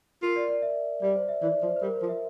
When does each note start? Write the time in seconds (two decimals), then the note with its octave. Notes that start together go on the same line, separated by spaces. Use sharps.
0.22 F4 A#4
0.36 D5
0.48 D5
0.62 E5
1.02 G3 D5
1.15 C5
1.29 E5
1.42 E3 D5
1.62 F3 C5
1.76 C5
1.82 G3 A#4
1.96 C5
2.02 F3
2.09 E5